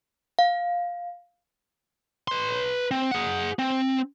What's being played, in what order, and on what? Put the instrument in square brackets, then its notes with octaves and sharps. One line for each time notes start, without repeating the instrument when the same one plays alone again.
[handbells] F5
[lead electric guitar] B4 C6
C4
G#4 F#5
C4